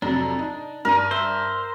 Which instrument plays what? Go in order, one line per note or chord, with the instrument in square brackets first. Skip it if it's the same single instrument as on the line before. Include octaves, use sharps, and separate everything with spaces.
[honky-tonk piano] F2 C3 F#3 [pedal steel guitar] D4 [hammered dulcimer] A#5
[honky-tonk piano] D#4
[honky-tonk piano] G2 D4 D#7 [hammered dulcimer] A#4
[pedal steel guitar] C5 [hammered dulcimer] E5